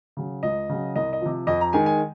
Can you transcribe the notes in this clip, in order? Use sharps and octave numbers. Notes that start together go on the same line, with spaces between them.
C#3 F#3
C#2 D#5
C#3 F#3
C2 D#5
D#5
C3 F3
F2 D#5
A#5
D#3 G#3 G#5
G#5